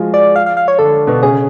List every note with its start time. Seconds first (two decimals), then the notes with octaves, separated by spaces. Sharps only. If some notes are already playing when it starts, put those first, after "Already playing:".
Already playing: F3 G#3 F4 F#4 G#4
0.14 D5
0.36 F5
0.46 F5
0.57 F5
0.68 C#5
0.79 D3 D4 A4
1.07 B2 B3
1.22 C#3 C#4 G#4